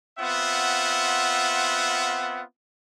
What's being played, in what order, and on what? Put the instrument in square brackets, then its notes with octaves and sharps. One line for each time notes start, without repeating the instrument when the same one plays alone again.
[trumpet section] B3 C4 F4 E5 F#5